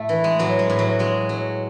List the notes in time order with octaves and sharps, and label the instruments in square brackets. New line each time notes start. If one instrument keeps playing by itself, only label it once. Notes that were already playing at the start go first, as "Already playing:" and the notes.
Already playing: [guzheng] A2 A3
E3
G#3
A2 F#3
G#3
A2
F#3
F#3 G#3
F#3